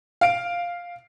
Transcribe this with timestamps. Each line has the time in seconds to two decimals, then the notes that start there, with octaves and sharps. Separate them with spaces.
0.21 F5 D7